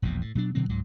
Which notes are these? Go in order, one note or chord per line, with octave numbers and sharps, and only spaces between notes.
E1 A#1 E2 B2
A2
B2 F#3 D4
B2 D3 F#3 C4
C#2 G#2 F#3